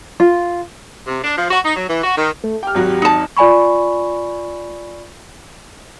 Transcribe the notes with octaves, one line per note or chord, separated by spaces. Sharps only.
F4
C3
D4
F3
F#4
D#4
F#3
E3
F#4
D#3
A3
G4 G5 F6
G#1 F#3 F#4
D#4 A5
F4 D5 G#5 B5 C#6